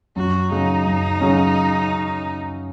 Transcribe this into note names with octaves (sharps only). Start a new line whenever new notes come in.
F#2 F#4
C#3 F#3 C#4 D#4
F#2
C#3 F#3 C#4